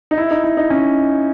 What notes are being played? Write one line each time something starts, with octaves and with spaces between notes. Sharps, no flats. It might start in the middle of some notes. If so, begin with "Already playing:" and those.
D#4
E4
D#4
E4
D#4
C#4